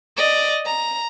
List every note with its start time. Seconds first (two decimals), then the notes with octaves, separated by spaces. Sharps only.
0.17 D5 D#5
0.66 A#5